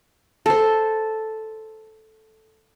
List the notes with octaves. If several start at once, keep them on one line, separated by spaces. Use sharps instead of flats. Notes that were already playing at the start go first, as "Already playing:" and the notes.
A4 C5